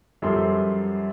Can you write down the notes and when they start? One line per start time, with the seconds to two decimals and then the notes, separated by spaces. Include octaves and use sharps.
0.22 F#2 F3 G3 A4 C6